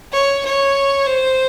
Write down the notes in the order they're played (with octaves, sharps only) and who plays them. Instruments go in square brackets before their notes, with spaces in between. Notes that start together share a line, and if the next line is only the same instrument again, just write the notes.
[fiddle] C#5
C#5
C5